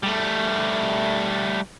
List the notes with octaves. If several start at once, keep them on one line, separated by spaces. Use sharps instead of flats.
G3 A3